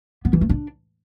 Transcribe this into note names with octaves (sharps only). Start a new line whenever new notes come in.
B3
E3
A3
D4